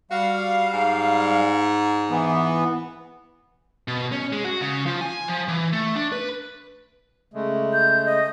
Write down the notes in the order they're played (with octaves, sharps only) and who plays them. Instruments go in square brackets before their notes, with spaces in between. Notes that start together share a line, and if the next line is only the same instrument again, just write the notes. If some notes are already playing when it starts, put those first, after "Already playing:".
[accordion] G3 F5 [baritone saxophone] F#4
[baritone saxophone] G#2
[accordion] E3 B3
[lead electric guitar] B2
C#4
G#3
F#4
C#3
F3
G#5
F3
E3
A3
D4
B4
[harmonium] C#3 G#3 A3
[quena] G6
D#5